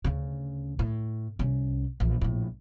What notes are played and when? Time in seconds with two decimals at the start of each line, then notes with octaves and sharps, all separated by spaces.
0.04 D2 C#3
0.79 A2
1.39 C2 C#4
2.00 A#1 E3
2.21 A#1 A2